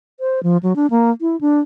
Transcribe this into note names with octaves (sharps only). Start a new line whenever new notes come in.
C5
F3
F#3
D4
A#3
E4
D4